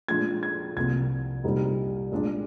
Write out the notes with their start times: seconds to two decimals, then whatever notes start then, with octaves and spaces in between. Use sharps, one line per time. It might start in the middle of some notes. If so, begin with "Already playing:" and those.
0.08 A#2 F3 G#3 D4 F4 G#6
0.43 G#6
0.76 C2 C3 F3 A#3 G#6
1.44 C2 A#2 G3 C4 D#4
2.12 A#2 G#3 D4